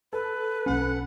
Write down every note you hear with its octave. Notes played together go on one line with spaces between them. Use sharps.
A4 B4
B1 A#3 C#4 F#5